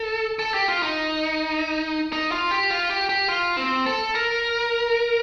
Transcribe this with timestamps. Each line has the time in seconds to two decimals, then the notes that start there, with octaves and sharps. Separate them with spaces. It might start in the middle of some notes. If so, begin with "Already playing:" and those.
Already playing: A4
0.39 A4
0.54 G4
0.68 F4
0.83 D#4
2.13 D#4
2.32 F4
2.51 G4
2.71 F4
2.90 G4
3.09 G4
3.29 F4
3.57 C4
3.86 A4
4.15 A#4